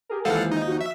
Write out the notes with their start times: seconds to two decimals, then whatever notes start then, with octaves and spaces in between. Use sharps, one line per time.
0.09 G4 G#4 A#4
0.25 D#2 E3 F3 G#3 A4 F5 F#5
0.52 D#4
0.67 F#4
0.81 E5